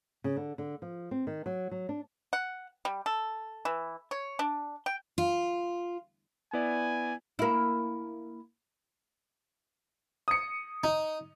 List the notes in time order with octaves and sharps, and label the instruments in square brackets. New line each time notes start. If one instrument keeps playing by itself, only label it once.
[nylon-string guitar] C#3
D3
D3
F3
C4
D#3
F#3
F#3
D4
[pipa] F#5
G3
A4
E3
C#5
D4
G5
[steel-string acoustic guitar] F4
[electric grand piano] B3 E4 D5 [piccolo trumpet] G#5
[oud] A#3 E4
[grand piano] D#6 C#7
[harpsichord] D#4